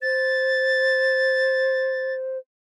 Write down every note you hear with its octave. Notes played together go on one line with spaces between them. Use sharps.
C5 A6